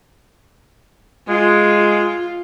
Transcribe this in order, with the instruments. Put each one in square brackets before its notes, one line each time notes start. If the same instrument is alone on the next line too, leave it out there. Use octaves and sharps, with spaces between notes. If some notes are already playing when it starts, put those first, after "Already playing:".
[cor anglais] G#3 [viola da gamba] F4